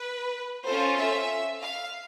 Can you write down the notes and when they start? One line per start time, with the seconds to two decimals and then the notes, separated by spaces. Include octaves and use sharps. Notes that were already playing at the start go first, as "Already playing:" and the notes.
Already playing: B4
0.67 C#4 F4 A4 C5
0.99 E5
1.60 F5